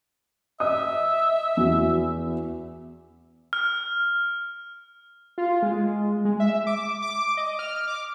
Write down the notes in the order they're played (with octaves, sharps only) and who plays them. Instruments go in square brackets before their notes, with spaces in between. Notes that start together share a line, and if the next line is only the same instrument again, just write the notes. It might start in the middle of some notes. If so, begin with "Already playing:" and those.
[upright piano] D#5 D#6 [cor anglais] E5
[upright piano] E2 F#4
[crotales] F6
[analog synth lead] F4
G#3
G#3
E5
D6
D6
D#5
F6
D6